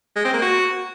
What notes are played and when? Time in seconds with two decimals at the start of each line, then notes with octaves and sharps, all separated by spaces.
0.16 G#3
0.25 C4
0.34 A#3
0.42 F#4